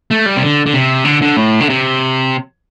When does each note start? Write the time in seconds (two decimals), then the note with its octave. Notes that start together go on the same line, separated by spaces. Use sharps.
0.11 A3
0.26 G3
0.37 C3
0.42 D3
0.66 D3
0.74 C3
1.05 D3
1.22 D3
1.37 A2
1.61 D3
1.69 C3